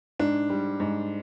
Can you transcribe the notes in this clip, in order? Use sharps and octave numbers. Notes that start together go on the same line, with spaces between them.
G#2 D4
G3
G#2